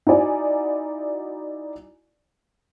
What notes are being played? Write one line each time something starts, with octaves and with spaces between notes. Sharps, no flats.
D#4 E4 F#4 D5 G#5